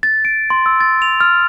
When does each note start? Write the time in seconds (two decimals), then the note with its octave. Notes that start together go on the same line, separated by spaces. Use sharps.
0.03 A6
0.25 D7
0.50 C6
0.66 E6
0.81 A6
1.02 F7
1.20 F6